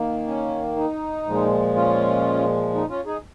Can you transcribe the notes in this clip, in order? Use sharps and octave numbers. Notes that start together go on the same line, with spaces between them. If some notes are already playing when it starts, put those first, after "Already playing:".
Already playing: D#3 A#3
C#4
D#4
A#2 F3 G#3
C#4 F4
D#4
C#4 F4
D#4 G#4